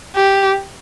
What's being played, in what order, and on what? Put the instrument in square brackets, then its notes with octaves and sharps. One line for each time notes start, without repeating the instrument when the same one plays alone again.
[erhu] G4